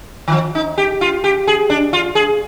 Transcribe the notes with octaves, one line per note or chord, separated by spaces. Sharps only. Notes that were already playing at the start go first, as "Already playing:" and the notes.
D#3
F3
D#4
G4
F4
G4
G#4
D4
F4
G#4